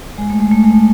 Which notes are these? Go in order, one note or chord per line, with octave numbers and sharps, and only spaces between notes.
G#3
A3
G#3
A3
G#3
A3